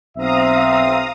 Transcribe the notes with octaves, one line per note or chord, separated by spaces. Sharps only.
B1 C4 E5 F5 A#5 D#6